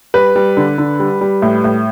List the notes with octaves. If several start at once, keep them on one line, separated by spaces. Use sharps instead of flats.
G3 B4
G3
D3
D3
G3
G3
A2
A2